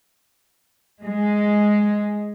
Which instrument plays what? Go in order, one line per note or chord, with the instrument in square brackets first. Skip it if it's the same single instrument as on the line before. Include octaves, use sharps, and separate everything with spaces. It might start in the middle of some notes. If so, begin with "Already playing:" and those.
[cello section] G#3